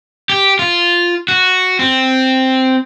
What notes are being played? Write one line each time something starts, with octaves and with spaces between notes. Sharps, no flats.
G4
F4
F#4
C4